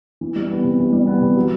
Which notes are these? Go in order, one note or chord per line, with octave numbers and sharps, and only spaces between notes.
E3
G3
B3
C3
E3
G3
B3
C3
F#3